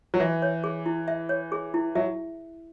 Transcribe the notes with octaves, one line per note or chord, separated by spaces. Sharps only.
F#3
E3 E5
C#5
G#4
E4
E5
C#5
G#4
E4
F#3 E5